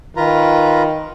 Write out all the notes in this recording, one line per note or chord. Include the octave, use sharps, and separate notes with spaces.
D#3 F4 B4 A#5